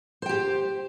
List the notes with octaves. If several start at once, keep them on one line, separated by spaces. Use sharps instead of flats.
G4 C5 G5